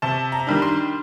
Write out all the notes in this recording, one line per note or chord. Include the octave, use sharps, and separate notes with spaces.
C3 A5
A#5
D#3 G3 D4
C6